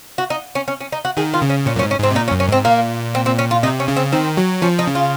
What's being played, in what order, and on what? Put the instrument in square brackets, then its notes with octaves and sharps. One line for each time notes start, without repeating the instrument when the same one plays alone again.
[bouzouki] F#4
D#4
C#4
C#4
C#4
D#4
F#4
[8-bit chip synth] D#3 [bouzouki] G#4
[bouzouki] F4
[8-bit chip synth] C#3
[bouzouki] C#4
[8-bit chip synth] A#2 [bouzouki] C#4
[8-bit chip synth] F#2
[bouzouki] C#4
[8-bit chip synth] G#2
[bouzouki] C#4
[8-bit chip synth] G#2 [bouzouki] C4
[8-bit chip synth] C3
[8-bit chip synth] A#2 [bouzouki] D#4
[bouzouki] C#4
[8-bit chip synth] F#2
[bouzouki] C#4
[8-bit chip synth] G#2 [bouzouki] C4
[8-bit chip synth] A#2 [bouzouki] A#3
[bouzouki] C4
C4
C#4
F4
[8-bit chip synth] C3 [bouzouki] D#4
[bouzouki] C#4
[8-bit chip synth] C#3
[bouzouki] C4
[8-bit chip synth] D#3 [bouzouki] C4
[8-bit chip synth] F#3
[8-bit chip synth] F3 [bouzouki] C#4
[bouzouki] D#4
[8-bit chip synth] C#3
[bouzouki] F4